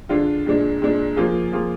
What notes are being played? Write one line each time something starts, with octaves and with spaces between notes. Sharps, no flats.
D3 G#3 D4 F4
A#2 G#3 D4
A#2 G#3 D4
F3 A#3 F4 G#4
F3 A#3 F4 G#4